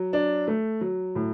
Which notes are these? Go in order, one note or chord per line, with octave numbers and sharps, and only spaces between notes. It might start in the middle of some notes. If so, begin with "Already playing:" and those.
Already playing: F#3
D4
A3
F#3
A2